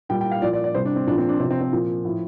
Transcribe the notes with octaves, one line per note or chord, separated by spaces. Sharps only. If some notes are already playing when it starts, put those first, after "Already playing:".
A#2 G3 G5
G5
F5
A#2 F3 D5
D5
D5
C3 G3 C5
D4
C4
A#2 F3 D4
C4
D4
C3 F3 C4
C4
C4
A#2 F3
A2 F3